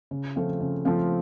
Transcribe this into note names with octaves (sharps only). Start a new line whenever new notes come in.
C#3
F3 A3 C4 F4
C#3
F3 A3 C4 F4